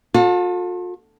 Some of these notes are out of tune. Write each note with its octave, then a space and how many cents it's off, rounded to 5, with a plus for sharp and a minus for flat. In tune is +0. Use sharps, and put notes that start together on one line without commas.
F4 +45 A4 +10